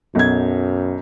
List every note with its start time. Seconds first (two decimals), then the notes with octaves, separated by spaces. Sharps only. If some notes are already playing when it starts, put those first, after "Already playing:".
0.15 B1 F#2 G#6